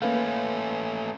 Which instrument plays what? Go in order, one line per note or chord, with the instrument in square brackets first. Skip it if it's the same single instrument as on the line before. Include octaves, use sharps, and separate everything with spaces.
[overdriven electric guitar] A3 C#4 [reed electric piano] A#3 B4 F5